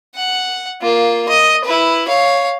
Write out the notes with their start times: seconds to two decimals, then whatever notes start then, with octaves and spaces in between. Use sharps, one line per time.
0.15 F#5
0.81 A#3 F4
1.29 D#5
1.65 E4 B4
2.07 C#5 F5